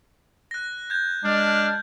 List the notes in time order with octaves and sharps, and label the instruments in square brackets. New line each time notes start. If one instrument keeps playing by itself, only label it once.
[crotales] F#6 A#6
G6 G#6
[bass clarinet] G#3 [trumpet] D4 [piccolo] F6